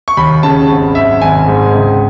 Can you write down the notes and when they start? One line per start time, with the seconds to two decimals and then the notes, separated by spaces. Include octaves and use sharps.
0.08 C#6
0.17 D#2 B5
0.43 C#3 A5
0.70 G#1
0.95 F#2 E5
1.22 G#1 G#5
1.48 G#2
1.75 C#2